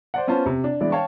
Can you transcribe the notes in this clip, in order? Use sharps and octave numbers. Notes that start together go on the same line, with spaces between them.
C5 D5 F#5
B3 C#4 F4 C5 A5
C3
D4
E3 G#3 B3 D4 D5
C#5 F5 G5 A5 C#6